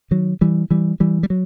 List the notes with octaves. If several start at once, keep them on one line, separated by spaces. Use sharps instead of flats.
D#3 F#3
E3 G3
E3 G3
E3 G3
G3
F#3